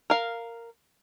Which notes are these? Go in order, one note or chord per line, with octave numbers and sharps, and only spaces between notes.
A#4 F5